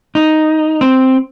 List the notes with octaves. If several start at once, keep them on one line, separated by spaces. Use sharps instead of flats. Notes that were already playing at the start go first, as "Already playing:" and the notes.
D#4
C4